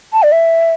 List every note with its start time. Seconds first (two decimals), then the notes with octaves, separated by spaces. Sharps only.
0.13 A5
0.23 D5
0.32 E5